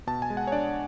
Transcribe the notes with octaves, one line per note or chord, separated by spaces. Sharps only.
B2 A5
G#5
G#3
F#5
C#5
D4 D5